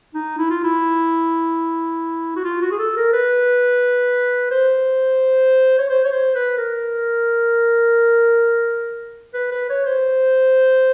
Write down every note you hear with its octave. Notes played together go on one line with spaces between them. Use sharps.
D#4
E4
F4
E4
F#4
F4
F#4
G#4
A4
A#4
B4
C5
C#5
C5
C#5
C5
B4
A#4
B4
B4
C#5
C5